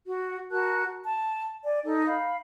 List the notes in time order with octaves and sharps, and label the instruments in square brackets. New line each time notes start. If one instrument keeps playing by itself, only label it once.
[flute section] F#4
F#4 A#4 A5 F#6
A5
D5 G#5
D#4 A4
F5 B5